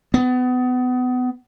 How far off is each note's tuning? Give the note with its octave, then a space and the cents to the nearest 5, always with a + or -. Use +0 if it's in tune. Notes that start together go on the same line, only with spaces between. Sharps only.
B3 +30